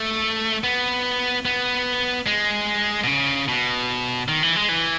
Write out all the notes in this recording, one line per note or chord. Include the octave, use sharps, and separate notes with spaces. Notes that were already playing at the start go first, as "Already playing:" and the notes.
Already playing: A3
B3
B3
G#3
B2
C#3
B2
D#3
E3
G#3
E3